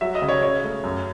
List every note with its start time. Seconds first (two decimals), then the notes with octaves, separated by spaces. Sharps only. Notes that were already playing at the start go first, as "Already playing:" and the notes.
0.01 F#3 E5
0.15 D#5
0.22 C#3
0.28 C#5
0.43 C#4 C#5
0.64 A3
0.84 F#2